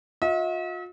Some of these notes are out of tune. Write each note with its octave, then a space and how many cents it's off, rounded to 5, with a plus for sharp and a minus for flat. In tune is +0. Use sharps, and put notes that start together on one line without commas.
F4 +45 E5 -45